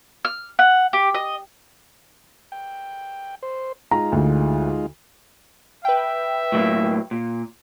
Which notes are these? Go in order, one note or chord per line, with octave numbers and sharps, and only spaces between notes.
F6
F#5
G4
D#5
G5
C5
G#3 D#4 F4 A#5
D2
B4 E5 G5
A2 F#3 A#3
A#2